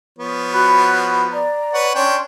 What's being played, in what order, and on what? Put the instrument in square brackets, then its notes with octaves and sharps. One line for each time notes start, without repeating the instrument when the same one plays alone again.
[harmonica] F3 B3 C#5
[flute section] F#4 B5 F#6
D5 A#5
[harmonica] B4 C#5 F#5
[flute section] C#4 C6 [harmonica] D4 C#5 G5